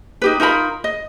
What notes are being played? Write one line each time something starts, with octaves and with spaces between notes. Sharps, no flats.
D#4 G4 B4
D#4 F4 A#4 B5
D#5